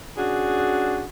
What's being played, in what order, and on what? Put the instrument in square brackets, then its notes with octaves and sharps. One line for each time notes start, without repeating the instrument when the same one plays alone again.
[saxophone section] C#4 D4 F#4 G#4